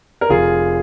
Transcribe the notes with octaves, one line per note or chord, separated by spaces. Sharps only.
A#4
F1 F4 G#4